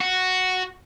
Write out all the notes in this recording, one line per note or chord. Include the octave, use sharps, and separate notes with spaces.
F#4